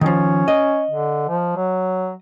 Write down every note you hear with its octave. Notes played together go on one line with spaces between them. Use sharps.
D#3 F3 C#4
D#5
D3
F3
F#3